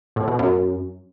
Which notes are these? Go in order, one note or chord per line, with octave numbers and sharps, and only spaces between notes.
A2
B2
F#2